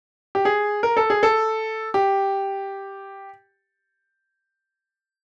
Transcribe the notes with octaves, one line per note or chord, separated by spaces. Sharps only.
G4
G#4
A#4
A4
G#4
A4
G4